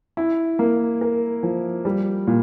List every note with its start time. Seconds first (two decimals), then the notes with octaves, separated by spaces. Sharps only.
0.17 E4
0.59 A#3
1.01 A#4
1.43 F3
1.85 G3
2.27 A#2